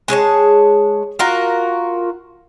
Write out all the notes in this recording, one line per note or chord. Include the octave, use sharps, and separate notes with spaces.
G#3 G#4 C#5 A5
F4 F#4 A#4